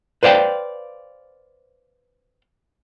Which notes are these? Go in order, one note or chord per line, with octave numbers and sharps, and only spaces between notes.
B4 C5 D5 F5 G5